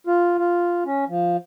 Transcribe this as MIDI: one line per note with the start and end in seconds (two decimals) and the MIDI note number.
0.07 0.38 65
0.38 0.84 65
0.86 1.05 61
1.09 1.37 53